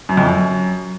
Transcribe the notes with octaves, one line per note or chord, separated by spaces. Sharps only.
F#2
F2
F#2